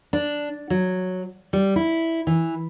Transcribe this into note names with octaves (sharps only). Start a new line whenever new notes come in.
D4
F#3
G3
E4
E3